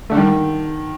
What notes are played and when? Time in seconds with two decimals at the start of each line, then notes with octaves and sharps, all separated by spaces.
0.10 D3 A3
0.17 D#3 G3